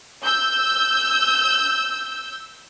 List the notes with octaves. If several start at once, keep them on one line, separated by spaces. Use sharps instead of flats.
E6 G6